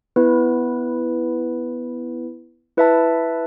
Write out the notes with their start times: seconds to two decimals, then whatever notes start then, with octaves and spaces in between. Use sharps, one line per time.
0.16 B3 E4 B4
2.77 E4 B4 E5 A5